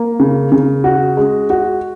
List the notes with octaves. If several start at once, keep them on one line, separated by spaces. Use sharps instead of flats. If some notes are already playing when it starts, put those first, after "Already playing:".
Already playing: A#3
C#3
C#3
F#4
G#3
F#4